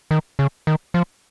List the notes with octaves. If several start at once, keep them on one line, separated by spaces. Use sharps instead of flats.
D#3
C#3
D#3
F3